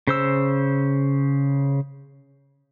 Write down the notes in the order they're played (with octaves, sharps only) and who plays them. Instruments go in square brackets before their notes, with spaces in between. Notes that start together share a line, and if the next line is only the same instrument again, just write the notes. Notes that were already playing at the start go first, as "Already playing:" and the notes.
[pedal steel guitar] C#3 C5 E6